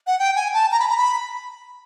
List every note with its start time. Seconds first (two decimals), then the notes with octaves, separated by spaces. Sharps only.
0.07 F#5
0.19 G5
0.36 G#5
0.54 A5
0.72 A#5
0.80 B5
0.89 A#5
0.97 B5